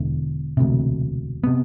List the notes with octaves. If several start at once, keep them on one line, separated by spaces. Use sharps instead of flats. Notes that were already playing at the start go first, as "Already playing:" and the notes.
Already playing: E1 E2 D3
E1 D2 C3
C3 B3